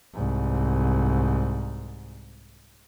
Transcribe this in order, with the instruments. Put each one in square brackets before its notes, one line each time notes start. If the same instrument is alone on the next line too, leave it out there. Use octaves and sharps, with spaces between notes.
[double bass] C2 G#2